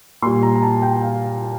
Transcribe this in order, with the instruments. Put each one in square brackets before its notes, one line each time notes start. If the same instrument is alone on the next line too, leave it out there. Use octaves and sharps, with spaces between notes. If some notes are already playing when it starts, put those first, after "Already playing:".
[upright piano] A#2 G3 C6
A#5
A#5
A5
G5
F5